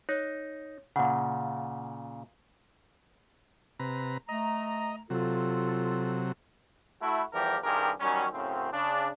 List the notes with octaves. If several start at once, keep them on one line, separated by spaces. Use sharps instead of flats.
D#4 C#5
A#2 C#3 F#5
C3 B4 A#5
A3 D#5 A#5
C3 F#3 F4 A4
A3 E4 F#4
E2 E3 F3 G3 G4 A#4
C2 G2 D#3 G4 G#4 A#4
D#3 F#3 G3 C#4
F#2 A2 C#3 C4
C#3 D4